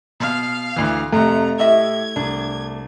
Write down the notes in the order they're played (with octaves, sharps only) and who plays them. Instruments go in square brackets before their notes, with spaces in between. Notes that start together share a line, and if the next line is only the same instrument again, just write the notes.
[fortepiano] B2 F6 [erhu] F5
[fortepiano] D2 E3
[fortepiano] F2 C3 [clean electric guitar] A3 [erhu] A#5
[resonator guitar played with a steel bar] A2 D#5 E5 [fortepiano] E4 G4 [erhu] G#6
[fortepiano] C2 [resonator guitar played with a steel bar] D4